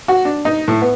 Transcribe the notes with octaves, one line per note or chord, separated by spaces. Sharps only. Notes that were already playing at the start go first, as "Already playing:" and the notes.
F#4
D4
D#4
A2
B3